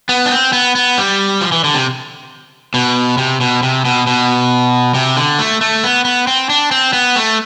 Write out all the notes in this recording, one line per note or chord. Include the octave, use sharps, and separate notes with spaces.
B3
D4
C4
B3
B3
G3
F3
E3
D3
C3
B2
C3
B2
C3
B2
B2
C3
D3
A3
A3
B3
B3
C4
D4
C4
B3
A3